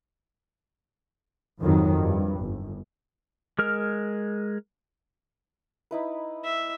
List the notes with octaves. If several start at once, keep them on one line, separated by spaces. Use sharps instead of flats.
F2 G#2 D#3 F#3
G2
G1
G#3 A#4 F6
D#4 E4 B4
E5